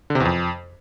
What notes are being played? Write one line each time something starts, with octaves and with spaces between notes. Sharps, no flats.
D3
C3
E2
F2